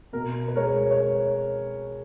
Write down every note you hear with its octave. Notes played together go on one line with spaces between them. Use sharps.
B2 A#4
B4
G#3 A#4 C#5
C#5